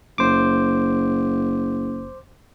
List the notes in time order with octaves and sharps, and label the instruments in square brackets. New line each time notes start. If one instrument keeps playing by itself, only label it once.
[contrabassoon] F#1 [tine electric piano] C5 D6